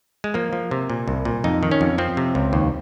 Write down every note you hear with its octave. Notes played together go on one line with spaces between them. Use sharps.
G#3
F3 A#3
F3
C3
A#2
C2
A#2
F2 D#4
D#3
C#4
F2
F3 C4
C3
C#2
D#2